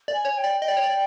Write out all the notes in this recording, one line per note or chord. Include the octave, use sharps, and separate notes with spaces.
D5
G#5
C#5
G5
D5
D#5 G5
D5
C#5
D5